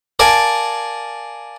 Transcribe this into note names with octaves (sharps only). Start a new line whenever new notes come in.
A#4 D5 F5 G#5 A5